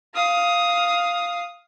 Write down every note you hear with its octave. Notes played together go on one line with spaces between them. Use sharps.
F5 D#6